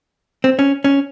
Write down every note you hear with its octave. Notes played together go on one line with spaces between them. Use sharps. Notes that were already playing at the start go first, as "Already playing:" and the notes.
C4
C#4
C#4